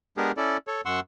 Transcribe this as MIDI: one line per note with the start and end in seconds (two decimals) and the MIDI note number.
0.17 0.32 56
0.17 0.32 59
0.17 0.32 62
0.17 0.32 67
0.17 0.32 68
0.17 0.32 70
0.37 0.57 61
0.37 0.57 64
0.37 0.57 69
0.37 0.57 74
0.67 0.81 69
0.67 0.81 73
0.86 1.00 42
0.86 1.00 78
0.86 1.00 84
0.86 1.00 85
0.86 1.00 88